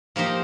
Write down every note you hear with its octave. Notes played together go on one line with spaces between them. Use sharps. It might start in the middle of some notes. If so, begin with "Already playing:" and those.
F3 A#3 D#4 G4 C5